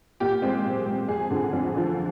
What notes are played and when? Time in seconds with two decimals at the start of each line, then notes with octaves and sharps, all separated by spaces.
0.20 A#2 G4
0.42 G#3 C4
0.65 A#2
0.87 G#3 C4
1.08 F2 G#4
1.31 D3 F3
1.53 F2
1.76 D3 F3